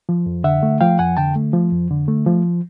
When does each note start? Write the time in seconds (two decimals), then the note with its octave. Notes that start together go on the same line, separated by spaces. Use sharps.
0.09 F3
0.26 F2
0.44 D3 E5 F#5
0.63 A3
0.81 F3 F5 G5
0.99 F2 F#5 G#5
1.17 D3 G5 A5
1.36 A3
1.53 F3
1.71 F2
1.91 D3
2.08 A3
2.27 F3